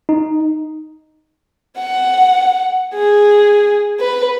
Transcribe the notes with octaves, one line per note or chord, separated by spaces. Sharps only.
D#4
F#5
G#4
B4